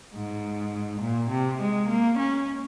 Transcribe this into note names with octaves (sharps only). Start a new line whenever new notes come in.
G#2
A#2
C3
G#3
A#3
C#4